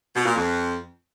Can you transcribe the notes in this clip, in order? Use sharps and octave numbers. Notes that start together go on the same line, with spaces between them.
B2
A#2
F2